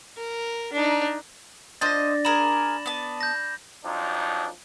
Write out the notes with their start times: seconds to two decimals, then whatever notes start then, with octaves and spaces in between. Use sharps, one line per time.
0.17 A#4
0.73 D4 D#4
1.81 D4 F4 C5 D#5 A6 A#6
2.25 G#4 A#4 A#5 B5 E7 F#7
2.86 B3 A5
3.21 G6 A#6
3.85 F2 F3 F#3 D4 D#4